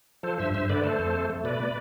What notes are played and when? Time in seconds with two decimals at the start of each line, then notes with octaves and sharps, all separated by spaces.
0.23 F3 A4 C5
0.38 G2 C5 E5
0.54 G2 C5 E5
0.69 D3 B4 D5
0.83 A3 A4 C5
0.99 F2
1.14 A3
1.30 A3
1.44 B2 B4 D5
1.60 B2